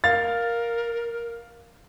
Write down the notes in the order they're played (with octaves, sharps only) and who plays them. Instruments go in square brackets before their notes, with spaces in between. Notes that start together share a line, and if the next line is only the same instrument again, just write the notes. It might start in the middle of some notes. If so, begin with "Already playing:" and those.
[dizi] A#4 [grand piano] F5 A6